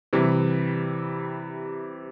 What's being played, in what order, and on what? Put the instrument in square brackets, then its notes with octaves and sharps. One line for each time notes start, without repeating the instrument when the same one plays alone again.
[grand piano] C3 E3 G3